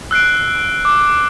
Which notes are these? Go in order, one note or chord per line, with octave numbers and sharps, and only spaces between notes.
E6 F#6 C7 D7
D6